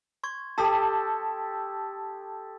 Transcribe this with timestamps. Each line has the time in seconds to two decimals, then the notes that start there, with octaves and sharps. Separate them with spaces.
0.23 C6 C#6 G#6
0.58 G4 A4 A5 D#6 B6